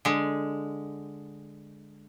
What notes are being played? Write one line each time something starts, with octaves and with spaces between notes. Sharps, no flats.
D3 G#3